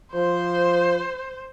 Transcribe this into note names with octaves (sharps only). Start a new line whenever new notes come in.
F3 C5